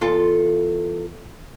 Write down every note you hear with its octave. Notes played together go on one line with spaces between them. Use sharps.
E2 F4 A4